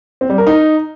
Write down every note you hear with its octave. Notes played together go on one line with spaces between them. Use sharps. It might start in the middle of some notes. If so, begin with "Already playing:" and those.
C4
G3
A#4
D#4